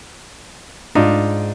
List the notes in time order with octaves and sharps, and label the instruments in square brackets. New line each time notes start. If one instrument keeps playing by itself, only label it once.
[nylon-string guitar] G#2 [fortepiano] D4 D#4 F4